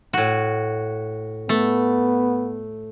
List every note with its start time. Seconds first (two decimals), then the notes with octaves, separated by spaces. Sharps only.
0.13 A2 F#4
1.49 A3 B3